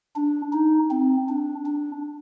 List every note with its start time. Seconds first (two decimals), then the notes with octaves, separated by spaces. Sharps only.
0.16 D4
0.53 D#4
0.91 C4
1.29 D4
1.65 D4